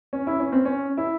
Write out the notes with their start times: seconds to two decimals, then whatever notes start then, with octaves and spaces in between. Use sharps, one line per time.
0.13 C#4
0.27 E4
0.40 C#4
0.52 C4
0.65 C#4
0.97 E4